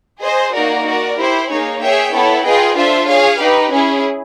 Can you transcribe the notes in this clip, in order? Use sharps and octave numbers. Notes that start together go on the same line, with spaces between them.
G#4 C5 D#5
A#3 D#4 F#4 A#4 D5
F#4 A#4 D5
E4 G4 C5
A#3 D#4 G#4 C#5
G#4 C#5 E5 G5
B3 E4 A4 C#5
F4 G#4 B4 D#5 G5
D4 F4 A4 C5 E5
G#4 C#5 F5
D#4 G4 B4
C#4 E4 G#4